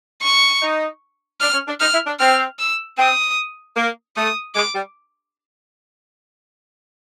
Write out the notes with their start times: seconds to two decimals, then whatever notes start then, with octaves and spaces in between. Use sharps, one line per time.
0.22 C#6
0.62 D#4
1.40 D4 F6
1.53 C#4
1.67 D4
1.80 D#4 F6
1.93 E4
2.06 D4
2.19 C4 F6
2.59 E6
2.98 C4 D#6
3.76 A#3
4.16 A3 D#6
4.55 G#3 D6
4.75 G3